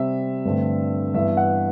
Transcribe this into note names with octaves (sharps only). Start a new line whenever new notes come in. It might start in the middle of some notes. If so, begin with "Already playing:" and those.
Already playing: C3 G3 C4 E5
G2 D3 A3 C4
G2 E3 B3 E5
F#5